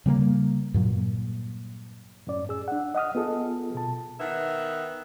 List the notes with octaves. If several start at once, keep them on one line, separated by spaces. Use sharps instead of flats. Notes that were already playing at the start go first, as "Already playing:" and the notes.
C#3 G3 A3 A#3
G2 A#2 F#3
F#2 A2 C#4 D5
G#4 E6
D4 F#5
D#5 F#5 D#6 F6
B3 F4 G#4 A4
B2 A5
D#3 B3 E5 F#5